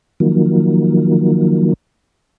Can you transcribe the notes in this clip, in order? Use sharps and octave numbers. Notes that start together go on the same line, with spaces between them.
D#3 F3 F#3 A#3